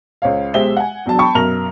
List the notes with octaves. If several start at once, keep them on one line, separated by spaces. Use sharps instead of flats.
C#2 C5 C#5 F5
B1 G#3 G4 C5 E5 G7
F#5 G#5
E1 F#3 D4 A5
G5 A5 B5 C#6
B1 F#2 A#4 A#5 F6 F7